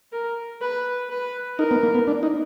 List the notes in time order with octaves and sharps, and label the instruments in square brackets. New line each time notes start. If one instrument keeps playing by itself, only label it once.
[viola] A#4
B4
B4
[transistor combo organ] D#4 [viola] A#4
[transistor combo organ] B3
A#3
B3
D4
D#4